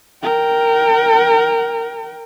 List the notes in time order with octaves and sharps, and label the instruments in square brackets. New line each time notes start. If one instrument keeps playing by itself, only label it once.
[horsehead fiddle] A#4 G5